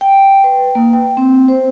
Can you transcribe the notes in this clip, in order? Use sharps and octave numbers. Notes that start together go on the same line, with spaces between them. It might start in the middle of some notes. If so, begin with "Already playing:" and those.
G5
B4
A#3
G5
C4
C5